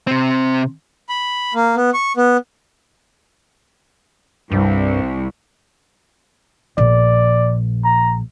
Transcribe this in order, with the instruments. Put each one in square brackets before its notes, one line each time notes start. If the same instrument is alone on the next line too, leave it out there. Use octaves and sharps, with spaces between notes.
[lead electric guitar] C3 C4
[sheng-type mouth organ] B5
A#3
B3
C#6
B3
[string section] C2 [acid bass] G2
[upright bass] A#1 [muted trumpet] D5
[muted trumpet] A#5